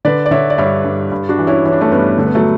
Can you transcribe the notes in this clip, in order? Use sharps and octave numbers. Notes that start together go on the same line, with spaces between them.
D3 B4 D5
D5
D3 C#5 E5
D5
G2 C#5 E5
G2
G2
D4 F#4
E3
C#4 E4
E3 C#4
D4
A3 C#4
G2 G3 B3
D3 A3
B3
F#3 A3